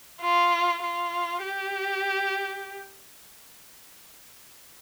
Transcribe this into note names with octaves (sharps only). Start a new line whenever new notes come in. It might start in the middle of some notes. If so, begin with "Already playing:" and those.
F4
F4
G4